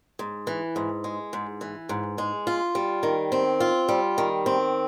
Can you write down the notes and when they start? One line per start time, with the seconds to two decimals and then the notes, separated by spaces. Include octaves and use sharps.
0.19 G#2
0.47 E3
0.76 G#2
1.04 G#3
1.33 G#2
1.61 E3
1.89 G#2
2.18 G#3
2.47 F4
2.75 G3
3.03 D#3
3.32 C4
3.60 F4
3.89 G3
4.18 D#3
4.46 C4